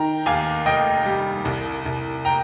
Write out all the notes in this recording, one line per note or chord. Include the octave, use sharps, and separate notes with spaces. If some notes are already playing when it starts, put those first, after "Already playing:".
Already playing: D#3 G5 A#5
D#2 F5 G#5
F1 D#5 G5
G3
C2
C2
G5 A#5